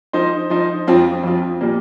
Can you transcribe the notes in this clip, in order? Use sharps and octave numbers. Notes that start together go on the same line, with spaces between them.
F3 D#4 C5
F3 D#4 C5
F2 F3 C4 F4
F2 F3 C4 F4
A#2 G3 A#3